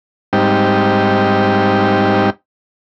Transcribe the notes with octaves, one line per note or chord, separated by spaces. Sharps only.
G#2 G3 C4 D#4 G4